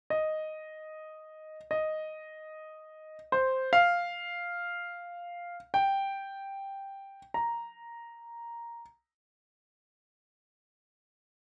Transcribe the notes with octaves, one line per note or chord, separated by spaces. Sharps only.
D#5
D#5
C5
F5
G5
A#5